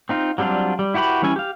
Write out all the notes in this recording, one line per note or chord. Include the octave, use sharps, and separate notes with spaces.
C4 D#4 F4
F#3 G3 C4 D4 F4
G3
E4 F#4 G4 B4 B5
E3 G3 C#4 E4 G#5
G4 F5